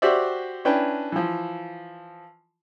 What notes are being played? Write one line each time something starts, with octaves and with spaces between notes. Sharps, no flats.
F#4 G4 C5 D5 E5
C#4 D4 E4 B4 G5
E3 F3